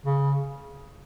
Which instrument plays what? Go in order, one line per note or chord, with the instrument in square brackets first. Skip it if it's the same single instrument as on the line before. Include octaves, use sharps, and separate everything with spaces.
[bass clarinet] C#3